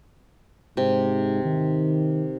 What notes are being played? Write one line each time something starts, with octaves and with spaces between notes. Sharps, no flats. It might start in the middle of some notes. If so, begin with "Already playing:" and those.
G#2 C3
D#3